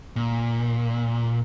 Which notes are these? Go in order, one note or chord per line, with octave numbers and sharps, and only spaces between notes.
A#2